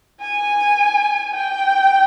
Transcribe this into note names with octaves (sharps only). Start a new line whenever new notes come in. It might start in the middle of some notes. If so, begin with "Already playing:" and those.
G#5
G5